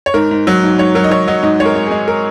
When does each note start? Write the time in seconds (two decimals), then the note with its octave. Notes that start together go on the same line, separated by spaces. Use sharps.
0.06 C#5
0.14 G#2 A#4
0.31 G#2
0.47 F#3
0.63 G#2
0.79 G#2 C#5
0.95 F#3 A#4
1.04 D#5
1.11 F#3 C#5
1.27 F#3 D#5
1.43 G#2 D#5
1.60 G#3 C#5
1.65 A#4
1.75 G#3
1.87 G#3 G#4
2.08 A#4